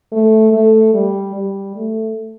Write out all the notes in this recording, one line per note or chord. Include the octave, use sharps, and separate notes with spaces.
A3
A3
G3
G3
A3